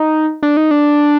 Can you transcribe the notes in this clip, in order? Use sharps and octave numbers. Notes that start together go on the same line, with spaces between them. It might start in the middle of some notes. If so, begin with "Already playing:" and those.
Already playing: D#4
D4
D#4
D4